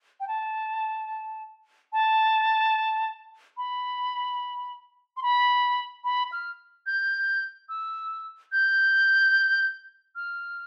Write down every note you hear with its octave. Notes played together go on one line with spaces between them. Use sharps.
G5
A5
A5
B5
C6
B5
B5
F6
G6
E6
G6
F6